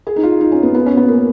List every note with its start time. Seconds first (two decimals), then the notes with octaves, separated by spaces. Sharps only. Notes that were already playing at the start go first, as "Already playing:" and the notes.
0.07 G#4
0.16 D#4
0.23 F4
0.41 D#4
0.52 C#4
0.63 B3
0.75 B3
0.86 C#4
0.97 B3
1.08 A#3